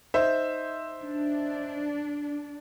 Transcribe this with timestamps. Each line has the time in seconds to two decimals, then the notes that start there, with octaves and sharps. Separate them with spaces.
0.14 D#4 C5 E5
1.02 D4